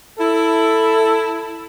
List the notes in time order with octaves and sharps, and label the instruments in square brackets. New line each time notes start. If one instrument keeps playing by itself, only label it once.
[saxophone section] E4 [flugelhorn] A4